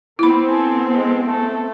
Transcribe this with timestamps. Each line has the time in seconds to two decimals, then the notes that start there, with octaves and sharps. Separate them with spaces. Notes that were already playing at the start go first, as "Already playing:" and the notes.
0.19 B3 C4 E4 B5
0.49 A4 G#5
0.90 G#3 A4
1.24 A3 A4